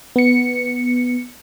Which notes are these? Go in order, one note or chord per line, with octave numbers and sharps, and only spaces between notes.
B3 C#7